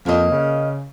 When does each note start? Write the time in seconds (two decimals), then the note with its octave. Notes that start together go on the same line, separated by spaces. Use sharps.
0.06 F2 A#3 D#5
0.31 C#3